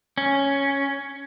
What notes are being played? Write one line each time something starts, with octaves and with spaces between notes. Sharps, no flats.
C#4